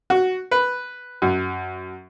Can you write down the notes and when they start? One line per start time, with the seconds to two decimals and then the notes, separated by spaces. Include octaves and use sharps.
0.10 F#4
0.51 B4
1.22 F#2